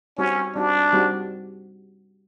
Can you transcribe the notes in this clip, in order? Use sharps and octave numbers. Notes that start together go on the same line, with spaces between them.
G3 C4 C#4 D#4 F#4
G3 C4 D4 D#4 F#4
G3 C4 D#4 F#4